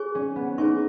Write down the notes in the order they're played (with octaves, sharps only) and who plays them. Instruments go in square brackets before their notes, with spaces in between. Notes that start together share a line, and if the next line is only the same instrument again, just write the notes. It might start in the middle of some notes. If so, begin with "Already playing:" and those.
Already playing: [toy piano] G#4 C#5 G#5 C#6
[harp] C#4
B3
[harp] D#4 [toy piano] G#4 C#5 G#5 C#6